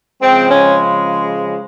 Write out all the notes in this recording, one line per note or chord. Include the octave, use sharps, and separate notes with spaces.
C#3 F3 G#3 C4
C#4